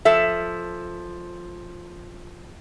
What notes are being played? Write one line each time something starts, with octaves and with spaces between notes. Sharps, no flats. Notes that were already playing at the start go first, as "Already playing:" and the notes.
F3 A4 E5